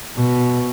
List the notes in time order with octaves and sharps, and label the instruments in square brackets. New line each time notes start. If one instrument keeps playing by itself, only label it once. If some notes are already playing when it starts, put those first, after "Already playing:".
[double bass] B2